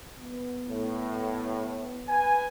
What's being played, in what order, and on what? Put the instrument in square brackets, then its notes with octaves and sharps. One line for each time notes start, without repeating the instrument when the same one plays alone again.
[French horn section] B3
[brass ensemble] A2
B4 G#5